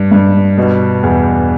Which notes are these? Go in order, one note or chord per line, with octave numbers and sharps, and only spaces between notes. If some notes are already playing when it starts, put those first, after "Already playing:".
Already playing: G2
G2
B2
E2